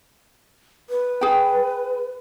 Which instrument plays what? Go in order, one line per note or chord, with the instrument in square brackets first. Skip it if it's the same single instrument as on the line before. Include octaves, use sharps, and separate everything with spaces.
[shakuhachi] B4
[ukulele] G#4 G5